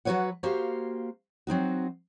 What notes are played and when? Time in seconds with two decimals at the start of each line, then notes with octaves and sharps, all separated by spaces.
0.05 F#3 F#4 A#4 B4 C#5 F#5
0.43 A#3 F#4 G4 C5 F5
1.47 F#3 C4 D#4 F#4